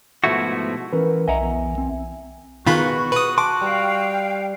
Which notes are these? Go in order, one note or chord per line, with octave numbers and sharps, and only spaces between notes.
G#2 B2 F3 A3 E4 F#4
E3 C#4 A#4 B4
B1 D#5 E5 F#5 G#5 A#5
E2
C4
B2 D#3 F4 F#4 G#4 B4 B5 C#6
B4 D#6
A5 C6 D6
G3 F5 G5